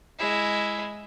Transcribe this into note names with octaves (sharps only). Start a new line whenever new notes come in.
G#3 E4